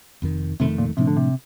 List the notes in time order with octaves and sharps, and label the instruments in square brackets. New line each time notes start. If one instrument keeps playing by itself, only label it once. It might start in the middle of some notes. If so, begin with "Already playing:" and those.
[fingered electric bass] F1 F2 D#3
[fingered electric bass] F1 F2 D#3 A3 [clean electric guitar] C3
[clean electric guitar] A#2
[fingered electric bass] A2 F3 A3 D4 [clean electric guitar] C3
[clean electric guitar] D3
C3